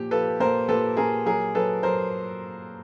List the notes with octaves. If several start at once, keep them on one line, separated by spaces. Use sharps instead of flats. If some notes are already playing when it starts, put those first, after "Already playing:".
Already playing: A#2 F3 G4
F3 A4 B4
A#2 A#4 C5
A#2 A4 B4
A#2 G#4 A#4
F#3 G#4 A#4
F#3 A4 B4
F#3 A#4 C5